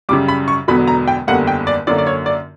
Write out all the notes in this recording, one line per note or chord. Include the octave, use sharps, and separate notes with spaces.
F#2 C#3 G3 D6
B5
C#6
E1 E2 D3 F#3 B3 B5
A#5
G5
F#1 E2 D3 G3 A#3 F#5
G5
D5
F#2 D3 A#3 C#4 D5
D5
C#5
D5